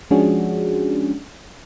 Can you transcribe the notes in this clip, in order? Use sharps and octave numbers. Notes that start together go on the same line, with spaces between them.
F3 G#3 C#4 D4 F#4 G#4